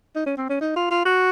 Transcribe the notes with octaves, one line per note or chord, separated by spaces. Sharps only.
D#4
C#4
C4
C#4
D#4
F4
F4
F#4